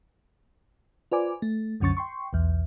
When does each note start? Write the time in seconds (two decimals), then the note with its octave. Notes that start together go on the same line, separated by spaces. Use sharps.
1.12 F4 B4 C5 D5 G#5 D6
1.42 A3
1.80 C2 F#2 D3 C#4 C#6 A6
1.97 G5 C6 C#6
2.33 B1 E2